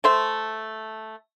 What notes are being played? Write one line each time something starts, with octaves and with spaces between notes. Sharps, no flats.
A3 C5 E5